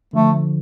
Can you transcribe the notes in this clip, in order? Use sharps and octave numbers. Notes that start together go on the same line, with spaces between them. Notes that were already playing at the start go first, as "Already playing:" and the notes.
D3 F3 A3